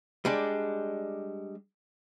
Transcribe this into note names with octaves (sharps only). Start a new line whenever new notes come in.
G3 G#3 D4